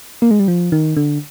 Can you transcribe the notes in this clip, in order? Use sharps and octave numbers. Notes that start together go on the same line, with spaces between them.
A#3
G#3
G3
F3
D#3
D3